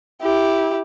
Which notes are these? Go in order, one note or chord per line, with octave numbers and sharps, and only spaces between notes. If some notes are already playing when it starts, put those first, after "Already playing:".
E4 G4